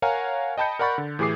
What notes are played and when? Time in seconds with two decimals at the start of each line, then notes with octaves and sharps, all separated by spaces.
0.02 A#4 C#5 F5 F#5 G#5 A#5
0.58 D#5 G5 A5 B5 G6 C#7
0.79 A#4 D5 F#5 B5 C#6 A6
0.98 D3
1.19 A2 E3 G4 G#4 D6 C7